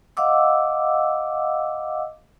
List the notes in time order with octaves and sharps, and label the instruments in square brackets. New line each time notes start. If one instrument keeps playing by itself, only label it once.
[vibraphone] D#5 F5 F#5 D6 E6